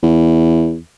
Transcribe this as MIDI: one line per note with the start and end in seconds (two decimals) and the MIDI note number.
0.03 0.78 40